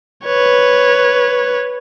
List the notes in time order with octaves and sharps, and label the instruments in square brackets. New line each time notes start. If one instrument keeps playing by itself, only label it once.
[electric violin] B4 C#5